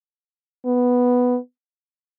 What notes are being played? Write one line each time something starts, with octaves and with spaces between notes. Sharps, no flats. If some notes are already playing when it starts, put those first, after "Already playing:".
B3